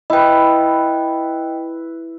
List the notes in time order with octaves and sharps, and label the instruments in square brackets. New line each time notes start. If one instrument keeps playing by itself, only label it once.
[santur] E4 B4 [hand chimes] D#5 G5